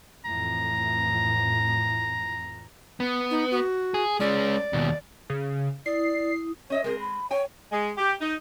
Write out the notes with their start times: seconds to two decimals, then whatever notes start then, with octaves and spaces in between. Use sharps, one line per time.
0.25 F2 A2 E3 A#5
3.00 B3
3.31 D#4
3.51 F#4
3.94 G#4
4.20 G#3 C#4 D5
4.73 D#2 B2
5.30 C#3
5.86 E4 D5 D#6 C7
6.70 C#4 C#5 D#5 E5
6.84 G#3 C4 G#4 A#4
7.00 B5
7.31 C#5 G5 G#5
7.72 G#3
7.98 G4
8.21 D#4